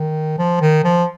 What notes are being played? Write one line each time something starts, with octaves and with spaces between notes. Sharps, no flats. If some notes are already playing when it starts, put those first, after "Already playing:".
Already playing: D#3
F3
D#3
F3